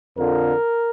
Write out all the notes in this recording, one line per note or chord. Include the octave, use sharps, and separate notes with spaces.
F2 D3 F3 A#4